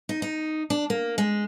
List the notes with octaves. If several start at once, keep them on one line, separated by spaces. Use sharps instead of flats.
D#4
D#4
D4
A#3
G#3